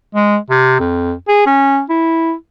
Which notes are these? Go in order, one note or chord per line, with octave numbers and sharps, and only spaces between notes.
G#3
C3
F2
G#4
C#4
E4